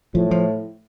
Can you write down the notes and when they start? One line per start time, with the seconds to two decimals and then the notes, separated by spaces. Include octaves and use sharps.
0.15 A2 F3
0.31 F3